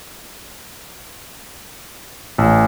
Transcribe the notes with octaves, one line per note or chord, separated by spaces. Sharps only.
A1